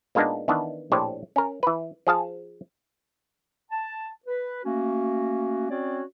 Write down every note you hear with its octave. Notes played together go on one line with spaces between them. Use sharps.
A#2 G#3 A#3 B3 D4 D#4
D#3 E3 B3 D4
A#1 A2 D4 G4 C5 C#5
C#4 A#4
E3 B4
F3 G#4 F5 A5
A5
B4
A3 A#3 C#4 F#4
C4 C#4 F#4 C#5 D5